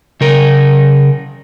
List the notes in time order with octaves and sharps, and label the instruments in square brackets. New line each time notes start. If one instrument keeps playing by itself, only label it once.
[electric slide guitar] C#3 A#4